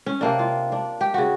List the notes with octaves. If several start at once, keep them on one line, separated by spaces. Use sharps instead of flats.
C#4
C3 A#3 D4
F4
D4
G4
C#3 F#4